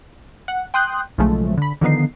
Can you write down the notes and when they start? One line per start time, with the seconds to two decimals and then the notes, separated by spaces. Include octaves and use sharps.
0.48 F#5
0.74 G5 C6 D#6 F#6 G6
1.18 B1 C#3 F3 G#3 A3
1.57 D3 B5
1.81 D3 D#3 F3 B3 D#4 C7